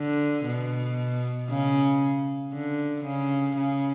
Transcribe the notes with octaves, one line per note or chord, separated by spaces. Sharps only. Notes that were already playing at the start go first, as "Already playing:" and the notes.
Already playing: D3
B2
C#3
D3
C#3
C#3